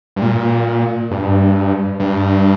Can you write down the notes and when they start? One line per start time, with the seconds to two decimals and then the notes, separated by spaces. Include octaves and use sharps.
0.16 G2
0.22 A#2
1.11 G2
2.00 G2